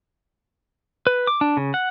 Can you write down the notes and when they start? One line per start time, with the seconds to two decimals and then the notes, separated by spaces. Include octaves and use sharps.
1.07 B4
1.27 D6
1.41 D4
1.57 C#3
1.74 F#5